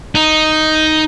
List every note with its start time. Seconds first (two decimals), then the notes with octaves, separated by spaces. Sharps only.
0.15 D#4